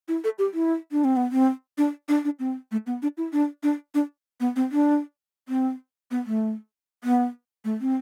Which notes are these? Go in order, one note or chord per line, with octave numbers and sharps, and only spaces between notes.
E4
A4
G4
E4
D4
C4
B3
C4
D4
D4
D4
C4
A3
B3
D4
E4
D4
D4
D4
B3
C4
D4
C4
B3
A3
B3
A3
C4